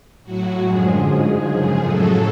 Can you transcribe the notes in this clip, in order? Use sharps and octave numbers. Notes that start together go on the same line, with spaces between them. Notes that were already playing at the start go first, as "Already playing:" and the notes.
A2 F#3 F#4
F#2 D3 F3 G#3 G#4
G#2 F3 G#3
F#2 C#3 F3 G#4
A2 F#3 A4